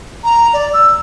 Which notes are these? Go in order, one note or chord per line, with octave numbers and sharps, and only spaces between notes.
A#5
D5
E6